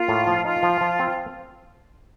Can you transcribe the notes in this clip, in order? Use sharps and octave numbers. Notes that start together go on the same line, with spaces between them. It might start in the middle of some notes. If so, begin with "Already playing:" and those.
Already playing: A#3 F4
A2
F3
D#4 F4
F3
F3
C4